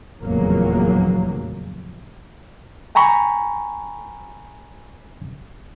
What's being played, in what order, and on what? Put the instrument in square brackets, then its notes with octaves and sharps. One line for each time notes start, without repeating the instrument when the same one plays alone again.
[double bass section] F1 E2 A#2 C#3 F#3 A#3
[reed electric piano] G5 G#5 A#5 B5 C#6